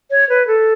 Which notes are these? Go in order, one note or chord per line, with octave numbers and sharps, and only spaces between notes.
C#5
B4
A4